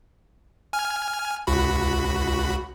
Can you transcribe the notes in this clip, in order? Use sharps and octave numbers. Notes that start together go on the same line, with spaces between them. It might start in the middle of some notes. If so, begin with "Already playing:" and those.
G#5 F6
C#2 F#4 B5